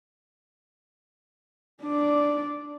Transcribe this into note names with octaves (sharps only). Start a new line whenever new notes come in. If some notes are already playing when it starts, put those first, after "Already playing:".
D4 D5